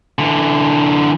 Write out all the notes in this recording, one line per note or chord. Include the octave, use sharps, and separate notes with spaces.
D3 E3